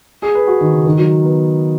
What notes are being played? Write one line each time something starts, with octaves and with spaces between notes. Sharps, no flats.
G#4
B4
F#4
D#3
C#3
D#3
F#3
B3